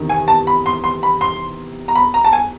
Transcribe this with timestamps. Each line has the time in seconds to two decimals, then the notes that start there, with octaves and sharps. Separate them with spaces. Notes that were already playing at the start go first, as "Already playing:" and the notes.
Already playing: E2 C3 D#3
0.09 G#5
0.28 A5
0.47 B5
0.66 C6
0.84 C6
1.03 B5
1.21 C6
1.88 A#5
1.95 B5
2.14 A#5
2.24 A5
2.33 G#5